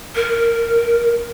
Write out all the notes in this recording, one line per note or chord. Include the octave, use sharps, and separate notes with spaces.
A#4